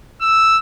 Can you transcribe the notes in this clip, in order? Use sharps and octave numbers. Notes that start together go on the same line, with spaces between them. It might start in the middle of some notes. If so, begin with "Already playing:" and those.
E6